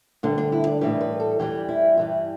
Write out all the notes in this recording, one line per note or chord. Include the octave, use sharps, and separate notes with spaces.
D2 D3 G3 D4
D4
E4
D5
A2 E3 G3 B4
B4
A4
E2 E3 G3 G4
E4
G2 E3 G3 E4